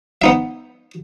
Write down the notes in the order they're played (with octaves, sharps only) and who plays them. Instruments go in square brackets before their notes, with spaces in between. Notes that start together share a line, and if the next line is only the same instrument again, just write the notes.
[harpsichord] B3 D#4 E5